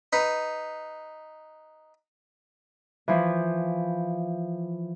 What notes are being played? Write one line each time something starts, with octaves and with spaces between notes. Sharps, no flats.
D#4 B4
E3 F3